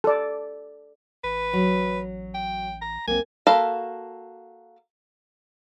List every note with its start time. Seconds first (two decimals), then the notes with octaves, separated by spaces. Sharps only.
0.04 A4 D5
1.24 A1 B4
1.53 F#3
2.34 G5
2.82 A#5
3.07 B1 A#3 C4 G#5
3.47 A#3 F#4 A4 F5 B5